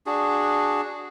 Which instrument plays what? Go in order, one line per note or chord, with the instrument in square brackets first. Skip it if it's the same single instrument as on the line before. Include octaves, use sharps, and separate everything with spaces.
[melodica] D4 F#4 G#4